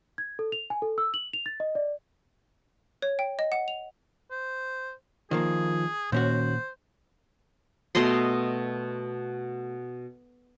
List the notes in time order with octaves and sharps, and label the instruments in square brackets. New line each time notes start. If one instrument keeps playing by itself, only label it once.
[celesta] G#6
A4
F7
G#5
A4
E6
F#7
F7
A6
D#5
D5
[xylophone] C#5
G5
D#5
F#5
F7
[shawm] C5
[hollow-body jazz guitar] D#3 F3 A#3 [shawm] G#4
[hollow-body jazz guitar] D#2 C#4 F#4 [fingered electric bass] A#2 [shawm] C5
[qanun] B2 A3 D#5 C6